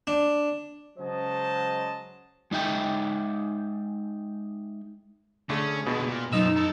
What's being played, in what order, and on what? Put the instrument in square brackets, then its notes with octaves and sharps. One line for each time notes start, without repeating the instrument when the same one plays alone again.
[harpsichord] D4
[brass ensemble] C#3 F#3 G#3 C5 D#5 A5
[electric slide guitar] G#3 D#4 E5 G5
[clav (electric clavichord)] D3 A3 [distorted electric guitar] C#4 [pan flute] G#4
[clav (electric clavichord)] B2 [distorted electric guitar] D3 E3
[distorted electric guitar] A#2
[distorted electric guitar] B1 F3 [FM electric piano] F#2 D#5 E6 [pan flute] D#4
[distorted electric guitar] A4 A#4